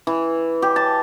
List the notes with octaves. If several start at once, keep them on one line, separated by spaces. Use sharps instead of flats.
E3
G4
A5